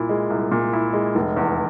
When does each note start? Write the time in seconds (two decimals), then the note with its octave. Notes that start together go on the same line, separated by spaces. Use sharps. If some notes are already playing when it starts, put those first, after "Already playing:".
Already playing: C2 A#2 E4
0.09 G#3
0.30 C2
0.52 A#2
0.73 E4
0.93 G#3
1.15 F1
1.37 E2